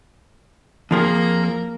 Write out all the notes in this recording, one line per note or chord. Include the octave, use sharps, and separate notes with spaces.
F2 F3 A#3 G#4 A#4